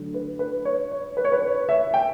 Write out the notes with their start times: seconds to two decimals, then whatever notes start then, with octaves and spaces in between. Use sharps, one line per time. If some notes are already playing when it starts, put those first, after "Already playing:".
Already playing: D3 F#3 A3
0.14 B4
0.39 B4
0.65 C#5
0.91 C#5
1.17 B4
1.25 C#5
1.32 B4
1.42 C#5
1.69 E5
1.94 G5